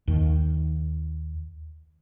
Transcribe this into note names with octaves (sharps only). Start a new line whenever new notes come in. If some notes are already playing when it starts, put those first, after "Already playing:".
D#2 D#3